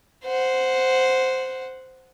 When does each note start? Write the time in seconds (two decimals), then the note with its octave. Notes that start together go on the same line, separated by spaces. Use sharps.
0.24 C5 F#5